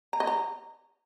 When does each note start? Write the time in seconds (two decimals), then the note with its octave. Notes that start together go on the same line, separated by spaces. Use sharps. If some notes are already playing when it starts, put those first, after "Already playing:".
0.13 A#5
0.20 D#5
0.27 A#5